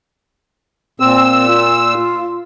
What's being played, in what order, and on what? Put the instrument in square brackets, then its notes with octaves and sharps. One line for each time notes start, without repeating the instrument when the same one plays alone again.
[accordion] A#2 E6 [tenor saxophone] C4
[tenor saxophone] F4